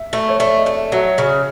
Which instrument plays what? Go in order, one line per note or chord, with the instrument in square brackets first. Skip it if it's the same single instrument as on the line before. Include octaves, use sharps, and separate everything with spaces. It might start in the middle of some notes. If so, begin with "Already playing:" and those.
Already playing: [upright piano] E5
[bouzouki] A3
[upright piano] C#5
[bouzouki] A3 [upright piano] D5
[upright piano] D#5
[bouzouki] A3
[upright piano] E5
[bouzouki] F#3 [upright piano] E5
[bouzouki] C#3